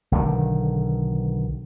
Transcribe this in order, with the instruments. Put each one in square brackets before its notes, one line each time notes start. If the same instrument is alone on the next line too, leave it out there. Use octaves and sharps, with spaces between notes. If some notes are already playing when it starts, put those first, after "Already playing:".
[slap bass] B1 D3 D#3